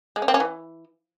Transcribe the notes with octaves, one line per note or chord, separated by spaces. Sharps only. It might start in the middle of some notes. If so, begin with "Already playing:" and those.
G#3
C#4
C4
C#4
E3